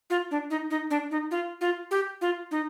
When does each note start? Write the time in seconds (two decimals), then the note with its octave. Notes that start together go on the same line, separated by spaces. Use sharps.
0.10 F4
0.31 D4
0.50 D#4
0.70 D#4
0.90 D4
1.11 D#4
1.31 F4
1.61 F4
1.91 G4
2.21 F4
2.51 D#4